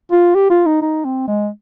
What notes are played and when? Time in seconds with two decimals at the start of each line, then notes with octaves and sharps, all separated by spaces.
0.12 F4
0.35 G4
0.50 F4
0.66 D#4
0.82 D#4
1.05 C4
1.28 G#3